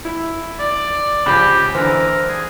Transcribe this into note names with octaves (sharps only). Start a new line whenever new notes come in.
E4
D5
C#2 F3 G4 B5
D3 E3 A#4 C5
G#4